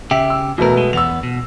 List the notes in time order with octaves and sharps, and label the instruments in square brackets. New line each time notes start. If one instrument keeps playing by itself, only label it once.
[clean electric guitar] C#3 G4 [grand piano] E5
[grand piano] E6
[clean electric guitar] E2 A#4 [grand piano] B2 A3 B3
[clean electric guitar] G#3
[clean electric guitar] E2 B3 [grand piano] E6 F7
[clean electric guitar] B2